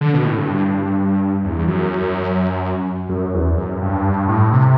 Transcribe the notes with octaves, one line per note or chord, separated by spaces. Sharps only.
D3
B2
A2
G2
E2
F#2
F#2
E2
F#2
G2
A2
C3